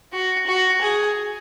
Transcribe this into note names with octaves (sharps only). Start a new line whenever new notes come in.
F#4
F#4
G#4